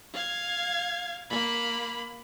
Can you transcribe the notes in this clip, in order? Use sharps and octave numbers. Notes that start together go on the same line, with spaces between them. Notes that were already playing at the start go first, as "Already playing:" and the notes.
F5 G#6
A#3 B5